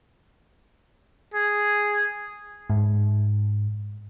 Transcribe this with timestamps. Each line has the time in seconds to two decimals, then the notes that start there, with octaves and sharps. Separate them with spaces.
1.34 G#4
2.70 G#2